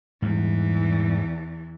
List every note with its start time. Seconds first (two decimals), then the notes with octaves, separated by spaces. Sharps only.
0.22 E2 G#2 E3 G3